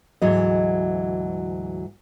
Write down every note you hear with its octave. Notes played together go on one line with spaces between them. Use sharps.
D2 G#2 E3 F#3 D#5